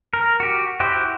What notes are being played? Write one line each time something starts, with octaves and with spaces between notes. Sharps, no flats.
A#4
F#4 G4
E4 F#4 G4 C5